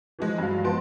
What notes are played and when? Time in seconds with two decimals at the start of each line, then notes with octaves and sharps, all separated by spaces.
0.19 E3 F3 G#3
0.38 G2 F#3 F5
0.64 F3 G#3 B3 A5 C6 D7